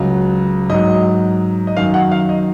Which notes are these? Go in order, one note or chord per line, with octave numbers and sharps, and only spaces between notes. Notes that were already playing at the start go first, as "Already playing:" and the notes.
Already playing: C#2 C#3 F#3
G#2 F#3 D#5
D#5
F#2 D#3 F#3 F5
F#5
F5
D#5